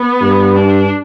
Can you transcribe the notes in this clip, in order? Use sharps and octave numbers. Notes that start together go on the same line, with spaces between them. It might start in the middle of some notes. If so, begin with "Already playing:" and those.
Already playing: B3
G2
D4